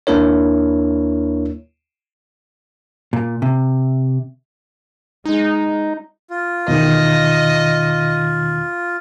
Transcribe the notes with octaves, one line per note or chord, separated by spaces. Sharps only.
D#2 A#3 D4 E4 A#4 C#5
A#2
C3
G#3 D#4
F4
E2 B2 D#3 D#5